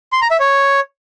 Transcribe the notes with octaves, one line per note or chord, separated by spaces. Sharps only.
C6
A#5
E5
C#5